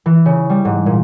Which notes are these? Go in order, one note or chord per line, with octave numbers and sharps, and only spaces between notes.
E3
C#3
G3
G#2
A#2